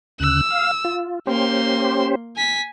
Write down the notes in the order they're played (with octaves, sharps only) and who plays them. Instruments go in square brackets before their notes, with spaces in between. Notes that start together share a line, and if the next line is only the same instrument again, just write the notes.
[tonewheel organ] D2 C#3 F#6 [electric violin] E6
[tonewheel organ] F5
F4
[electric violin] A#3 C6 [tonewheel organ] C#4 G4 C5
[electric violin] G#5 B6